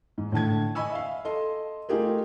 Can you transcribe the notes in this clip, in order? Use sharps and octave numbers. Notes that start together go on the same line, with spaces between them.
G#2
A2 D3 A5 G#6
D#5 G#5 B5 C#6 E6
E5 F5
A4 D#5 C6
A3 D#4 F4 G4 G#4 A#4